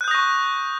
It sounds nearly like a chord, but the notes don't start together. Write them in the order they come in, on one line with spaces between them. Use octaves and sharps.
F#6 G6 D#6 A#6 C#6